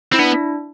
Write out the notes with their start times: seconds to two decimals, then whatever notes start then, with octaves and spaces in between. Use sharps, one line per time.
0.12 C4 E4
0.19 B3 D4